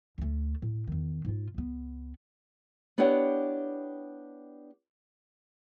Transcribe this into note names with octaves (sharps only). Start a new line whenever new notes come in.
D2 A3
A2
E2 D#3
G#2 F4
C#2 B3
B3 D4 E4 G4 C#5 F#5